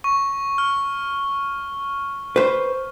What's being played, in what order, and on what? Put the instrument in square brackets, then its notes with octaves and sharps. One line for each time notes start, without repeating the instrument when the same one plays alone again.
[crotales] C#6
F6
[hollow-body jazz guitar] B4 C5